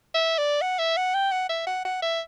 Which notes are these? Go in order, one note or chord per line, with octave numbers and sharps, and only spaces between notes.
E5
D5
F#5
E5
F#5
G5
F#5
E5
F#5
F#5
E5